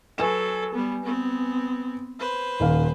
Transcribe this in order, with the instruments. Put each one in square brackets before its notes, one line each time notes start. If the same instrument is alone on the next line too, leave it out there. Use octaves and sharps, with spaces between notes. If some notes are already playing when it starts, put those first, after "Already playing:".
[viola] F#3 A4 [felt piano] B4 G#5 E7
[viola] G3 B3
B3 C4
B4 C5
[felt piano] D#1 D#3 F5